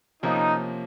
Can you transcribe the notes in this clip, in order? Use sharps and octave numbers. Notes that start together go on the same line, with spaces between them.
C3 F3 A#3 C#4 D#4